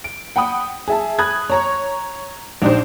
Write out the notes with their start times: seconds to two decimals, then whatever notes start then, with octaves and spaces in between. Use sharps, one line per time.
0.04 D7
0.36 F#5 G5 B5 D#6
0.88 G#4 E5 A5
1.19 B5 D#6 F#6 G#6
1.50 C#5 A#5 C#6
2.62 A#1 D4 D#4 G4 C5